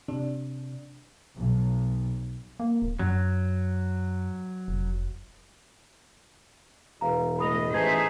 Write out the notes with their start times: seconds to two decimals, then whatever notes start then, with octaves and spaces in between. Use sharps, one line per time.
0.08 C3 D4
1.34 B1
2.60 A#3
2.82 D1
2.99 F#2 F#3
4.68 F1
7.01 E1 B4 F5 A#5
7.39 A2 D#5 B5 D#6 F7
7.74 A1 A3 D#4 G#4 B4 C5 E5 G#6